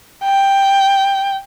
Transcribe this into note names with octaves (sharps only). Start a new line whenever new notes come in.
G5